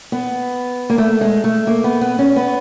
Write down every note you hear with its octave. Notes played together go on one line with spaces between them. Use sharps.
B3
A#3
A3
G#3
A3
A#3
B3
B3
C#4
B3